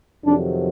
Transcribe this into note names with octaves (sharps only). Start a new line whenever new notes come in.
F2 C3 D#3 F#3 D4